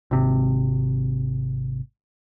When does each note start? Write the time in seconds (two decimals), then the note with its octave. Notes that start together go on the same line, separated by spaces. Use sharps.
0.11 G#1 C3